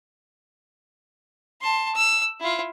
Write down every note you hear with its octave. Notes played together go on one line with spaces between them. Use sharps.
A5 C6
E6
E4 F4